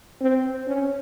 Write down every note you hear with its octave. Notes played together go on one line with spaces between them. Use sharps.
C4
C#4